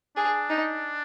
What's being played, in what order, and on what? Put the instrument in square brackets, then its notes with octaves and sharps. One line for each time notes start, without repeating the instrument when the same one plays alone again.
[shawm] D4 [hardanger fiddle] G#4
[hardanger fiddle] D#4